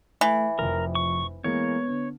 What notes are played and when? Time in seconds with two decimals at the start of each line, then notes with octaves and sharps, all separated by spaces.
0.21 E3 A3
0.59 F1 F2 F3 A#4
0.95 C#6
1.44 E3 G#3 A#3 B3 C#5
1.88 D3